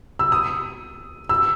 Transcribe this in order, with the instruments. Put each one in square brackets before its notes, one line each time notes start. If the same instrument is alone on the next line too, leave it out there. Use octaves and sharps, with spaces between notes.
[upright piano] E6
D#6
E6